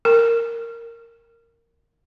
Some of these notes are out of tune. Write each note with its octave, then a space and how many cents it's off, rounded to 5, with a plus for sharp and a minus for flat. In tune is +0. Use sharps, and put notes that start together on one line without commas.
A#4 -10